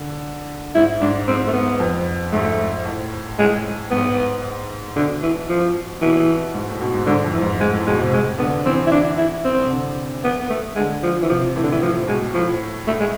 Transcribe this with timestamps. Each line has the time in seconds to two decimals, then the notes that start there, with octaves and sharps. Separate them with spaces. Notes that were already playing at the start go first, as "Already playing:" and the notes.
Already playing: D3
0.75 G#2 E4
1.01 G#2 D4
1.28 G#2 C4
1.47 A3
1.53 B3
1.80 F2
2.32 G#2 A3
2.85 A2
3.38 A2 G#3
3.91 G#2 B3
4.96 B2 D3
5.22 E3
5.49 F3
6.01 B2 E3
6.54 G#2
6.68 A2
6.81 B2
6.94 G#2
7.07 G#2 D3
7.24 F2
7.33 E3
7.42 G#2
7.60 G#2 G#3
7.73 A2
7.86 B2 G#3
7.99 C3
8.12 C3 G#3
8.38 D3 B3
8.65 E3 C4
8.87 E4
8.91 D4
9.17 E4
9.45 C4
9.64 C3
9.70 D3
10.24 B3
10.40 B3
10.50 A3
10.76 D3 G#3
11.03 F3
11.22 E3
11.29 C3 F3
11.56 A2 E3
11.63 D3
11.72 E3
11.82 A2 F3
12.07 B2 G#3
12.34 A2 F3
12.87 A3
13.00 G#3